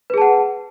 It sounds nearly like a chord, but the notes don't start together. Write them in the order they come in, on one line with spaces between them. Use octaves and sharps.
B4 G#4 A5 F#5